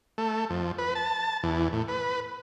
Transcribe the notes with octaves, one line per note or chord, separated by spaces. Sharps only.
A3
F2
B4
A5
E2
A2
B4